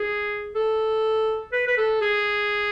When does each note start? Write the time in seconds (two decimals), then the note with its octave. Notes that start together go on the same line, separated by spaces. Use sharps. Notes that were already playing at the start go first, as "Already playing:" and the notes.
Already playing: G#4
0.55 A4
1.52 B4
1.67 B4
1.78 A4
2.02 G#4